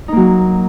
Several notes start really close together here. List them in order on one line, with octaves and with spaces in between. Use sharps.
D#4 A#3 F#3